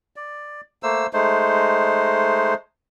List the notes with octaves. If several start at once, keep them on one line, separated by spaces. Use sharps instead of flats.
D5
A3 A#3 C5 E6
G#3 A3 D#4 C5